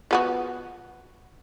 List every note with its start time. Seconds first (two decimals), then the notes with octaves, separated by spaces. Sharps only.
0.11 F3 B3 F#4